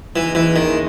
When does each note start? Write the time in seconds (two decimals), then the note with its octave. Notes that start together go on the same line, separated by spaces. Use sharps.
0.16 D#2 C#3 E3 G#3 D#4
0.35 E3
0.56 D#3